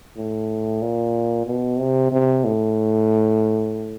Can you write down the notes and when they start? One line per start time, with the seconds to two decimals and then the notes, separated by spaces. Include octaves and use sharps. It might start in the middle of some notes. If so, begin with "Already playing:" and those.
0.17 A2
0.82 A#2
1.46 B2
1.79 C3
2.12 C3
2.45 A2